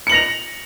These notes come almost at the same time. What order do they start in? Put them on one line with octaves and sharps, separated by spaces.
C#7 F#7 A#6 F7